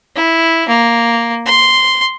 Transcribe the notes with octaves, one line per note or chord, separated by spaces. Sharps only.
E4
A#3
C6